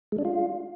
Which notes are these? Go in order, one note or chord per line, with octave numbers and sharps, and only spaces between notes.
G#3
D4
F4